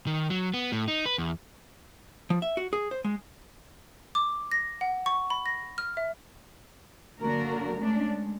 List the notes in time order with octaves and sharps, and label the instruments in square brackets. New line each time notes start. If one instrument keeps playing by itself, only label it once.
[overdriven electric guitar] D#3
F#3
B3
A2
D#4
B4
E2
[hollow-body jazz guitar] F3
E5
F#4
G#4
C5
G#3
[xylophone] D6
A#6
F#5
C#6
B5
A#6
F6
E5
[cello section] D3 F#3 A#3 D4 F#4 A#4
G#3 A3 C#4 D4
G#3